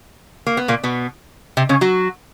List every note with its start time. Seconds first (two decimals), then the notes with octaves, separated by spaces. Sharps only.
0.47 A#3
0.57 B3
0.68 A#2 A#3
0.83 B2 B3
1.57 C3 C4
1.69 C#3 C#4
1.81 F#3 F#4